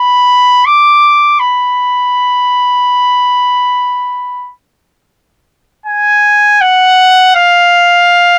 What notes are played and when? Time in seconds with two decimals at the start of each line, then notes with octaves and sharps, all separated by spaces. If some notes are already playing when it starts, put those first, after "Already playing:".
Already playing: B5
0.66 D6
1.40 B5
5.86 G#5
6.61 F#5
7.36 F5